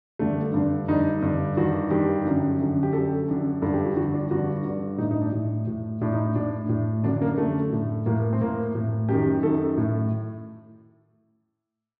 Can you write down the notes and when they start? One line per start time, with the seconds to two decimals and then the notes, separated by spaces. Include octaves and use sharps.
0.19 G2 D3 A3
0.54 G2 D3
0.88 G2 D3 D#4
1.22 G2 D3
1.57 G2 D#3 F#4
1.91 G2 D#3 G4
2.25 F#2 D3
2.59 F#2 D3
2.83 G4
2.93 F#2 D3 A4
3.28 F#2 D3
3.62 G2 D3 A4
3.74 G4
3.85 F#4
3.96 G2 D3 F#4
4.14 D4
4.31 G2 D3 F#4
4.65 G2 D3
4.98 A2 D#4
5.11 D#4
5.21 D4
5.32 A2
5.67 A2
6.01 A2 D4
6.12 D#4
6.35 A2 D4
6.69 A2
7.04 F#2 D3 D4
7.22 A#3
7.38 F#2 D3 A3
7.72 A2
8.06 A2 A#3
8.33 C4
8.41 A2 A#3
8.75 A2
9.08 F#2 G4
9.14 D#3
9.43 F#2 D#3 A4
9.77 A2